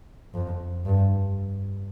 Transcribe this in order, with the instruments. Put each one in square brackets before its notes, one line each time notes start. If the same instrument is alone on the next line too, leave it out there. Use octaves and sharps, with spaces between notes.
[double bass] F2
G2